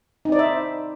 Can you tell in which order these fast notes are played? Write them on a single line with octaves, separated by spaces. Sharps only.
D#4 C4 D5 C5 E5